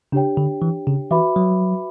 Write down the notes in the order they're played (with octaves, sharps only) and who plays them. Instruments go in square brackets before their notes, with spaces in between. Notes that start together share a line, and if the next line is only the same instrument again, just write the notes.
[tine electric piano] C#3 [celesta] D4 G4 C#5 G5
[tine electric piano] D3
E3
C#3
[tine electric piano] E3 [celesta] F#4 B4 E5 B5 D6
[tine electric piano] F#3